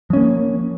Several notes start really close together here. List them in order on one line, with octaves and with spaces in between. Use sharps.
F3 C#4 A#3